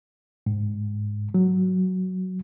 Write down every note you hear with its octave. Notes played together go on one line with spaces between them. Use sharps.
G#2
F#3